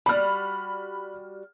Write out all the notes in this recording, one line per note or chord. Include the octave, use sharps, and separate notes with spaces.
G3 F#4 B5 F6